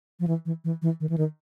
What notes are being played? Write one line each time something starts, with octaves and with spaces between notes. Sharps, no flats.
F3
E3
E3
E3
E3
D#3
E3
D#3